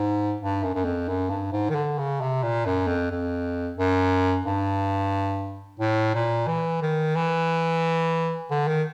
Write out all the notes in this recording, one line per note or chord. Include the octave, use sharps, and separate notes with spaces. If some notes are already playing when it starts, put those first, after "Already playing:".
Already playing: G#2
G2
F#2
F#2
F2
F#2
G2
G#2
D#3
D3
C#3
C3
A#2
F#2
F2
F2
F#2
G2
A2
A#2
E3
D#3
E3
D3
D#3